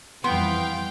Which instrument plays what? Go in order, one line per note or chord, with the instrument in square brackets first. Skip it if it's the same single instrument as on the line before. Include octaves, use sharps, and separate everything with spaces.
[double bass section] F2 E3 G3 [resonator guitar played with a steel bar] B3 [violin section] F5 G5 [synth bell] C6